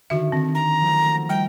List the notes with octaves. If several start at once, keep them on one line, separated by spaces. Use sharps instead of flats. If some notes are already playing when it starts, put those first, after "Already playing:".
D3 D#3 F#4 E5
D#3 C4
A#5
F3 F#3 A3
A#3
G3 G5